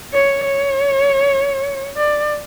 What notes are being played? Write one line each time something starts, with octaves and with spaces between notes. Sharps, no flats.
C#5
C#5
D5